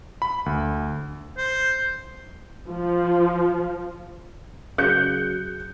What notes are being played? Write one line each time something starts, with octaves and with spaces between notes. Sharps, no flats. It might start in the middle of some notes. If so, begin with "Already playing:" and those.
B5
D2
C5
F3
C#3 F#3 F#6 G6 C#7